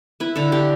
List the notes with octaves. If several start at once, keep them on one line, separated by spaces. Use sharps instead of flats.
E4 B4
D3 A4
D3 G4